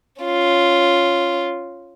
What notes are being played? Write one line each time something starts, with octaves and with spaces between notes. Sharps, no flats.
C#4 F4